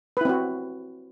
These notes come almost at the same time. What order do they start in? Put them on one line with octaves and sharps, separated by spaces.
B4 E4 C4 F#4